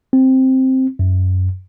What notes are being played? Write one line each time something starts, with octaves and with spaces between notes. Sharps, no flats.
C4
F#2